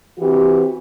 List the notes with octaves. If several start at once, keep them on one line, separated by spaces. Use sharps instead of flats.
E3 C4 F#4 G4